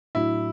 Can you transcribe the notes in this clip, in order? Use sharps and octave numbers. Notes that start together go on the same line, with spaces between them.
A2 F#3 A3 D4 E4 F#4